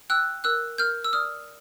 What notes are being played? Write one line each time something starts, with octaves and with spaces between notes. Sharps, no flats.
G5 E6 F#6
A#4 E6 F#6
A#4 F6 G6
E6
D5 D#6 F6